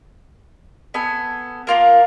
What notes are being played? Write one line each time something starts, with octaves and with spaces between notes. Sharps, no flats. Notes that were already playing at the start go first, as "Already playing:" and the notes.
B3 A4 G#5
A#3 F4 A#4